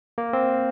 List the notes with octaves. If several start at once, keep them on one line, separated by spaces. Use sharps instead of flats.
A#3
C4